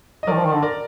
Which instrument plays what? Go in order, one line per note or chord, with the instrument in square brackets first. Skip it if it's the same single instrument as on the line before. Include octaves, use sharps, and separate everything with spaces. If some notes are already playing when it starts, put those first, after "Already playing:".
[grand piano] D#5
[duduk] D#3 F#3 [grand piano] A#4 D5
[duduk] F3
D#3
D3
[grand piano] A#4 D5